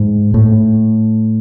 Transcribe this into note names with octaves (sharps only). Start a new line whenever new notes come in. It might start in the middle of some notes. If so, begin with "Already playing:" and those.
Already playing: G#2
A2